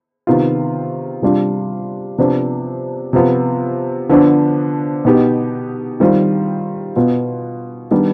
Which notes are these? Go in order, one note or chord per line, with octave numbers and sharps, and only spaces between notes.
C3 D#3 B3 F4
C3 G3 D4 F4
C3 F3 B3 D4
C3 F3 B3 F4
D3 F3 B3 D4
B2 B3 D#4 G4
D#3 G3 C4 F4
B2 B3 F4
D#3 G3 B3 D4